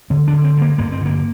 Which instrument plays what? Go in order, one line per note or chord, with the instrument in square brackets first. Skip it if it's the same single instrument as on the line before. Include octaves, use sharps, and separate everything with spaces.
[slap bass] D3 C4
D4
D3
C4
G2 A#3
G2 A#3
C4
D3 A#3